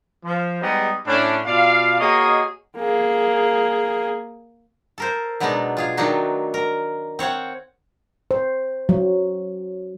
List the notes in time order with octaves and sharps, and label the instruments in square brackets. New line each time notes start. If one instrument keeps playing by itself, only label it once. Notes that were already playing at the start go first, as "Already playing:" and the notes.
[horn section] F3
G3 G#3 B3 D#4 G4 G#4
A2 C#4 D4
B2 F4 D5 F5
A#3 F#4 G#4 C#5 D#5
[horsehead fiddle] A#3 G#4
[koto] A4 A#4 C5
B2 F#3 G#3 B3 D4 D#4
F4 G#4 F5
D#3 F#3 A3 D4 D#4 F#4
A#4
C4 C#5 F5 F#5
[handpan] C5
F#3